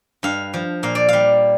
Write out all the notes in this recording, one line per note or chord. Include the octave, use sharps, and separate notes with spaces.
G2 F5
F3
A#2 F5
D5
G3 F5